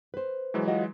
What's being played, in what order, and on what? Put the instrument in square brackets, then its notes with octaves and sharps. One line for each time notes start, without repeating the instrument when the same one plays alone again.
[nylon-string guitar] B4 C5
[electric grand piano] E3 F#3 G#3
[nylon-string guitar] F4 F#4 D#5